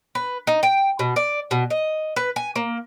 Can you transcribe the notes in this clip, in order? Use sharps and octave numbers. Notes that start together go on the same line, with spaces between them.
B4
D#4
G5
B2
D5
B2
D#5
B4
G#5
A#3